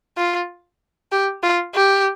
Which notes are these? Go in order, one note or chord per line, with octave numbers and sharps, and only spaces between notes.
F4
G4
F4
G4